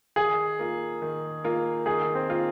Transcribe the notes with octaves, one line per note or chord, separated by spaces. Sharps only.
D#3 G#4
A#3 F4
D#3
A#3 F4
D#3 G#4
C4
A#3 F4